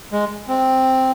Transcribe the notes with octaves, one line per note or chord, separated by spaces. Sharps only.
G#3
C4